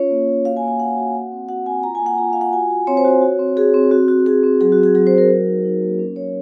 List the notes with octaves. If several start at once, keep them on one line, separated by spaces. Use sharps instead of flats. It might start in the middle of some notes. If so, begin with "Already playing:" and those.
Already playing: C#4 F4 C#5
A#3
A#3
F#4 F5
G#5
A#3
G#5
A#3 F#5
F#4
F#4
C4
F#4 F#5
C4 G#5
F4 A#5
G#5
A#3
F#5
F4 A#5
F4 F5
F#5
F#4 G#5
F#4
C4 C#5
C5
F#4 C#5
F#4
C4
F#4 G#4
C4
C4 F#4
F#4
F#4 G#4
C4
F#3 G#4
F#4
C4
G#4
F#3 G#4
C5
F#3
A#4
F#4
D#4
D#4
A#3
C#4
F#3 C#5